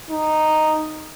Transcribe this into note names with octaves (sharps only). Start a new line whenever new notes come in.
D#4